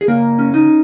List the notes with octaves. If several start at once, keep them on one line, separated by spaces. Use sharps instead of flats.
G#4
C#3 A#3 A#4
C#4
D#4